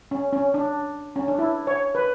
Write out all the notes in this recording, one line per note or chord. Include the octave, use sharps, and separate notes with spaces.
C#4
C#4
D4
C#4
D4
E4
C#5
B4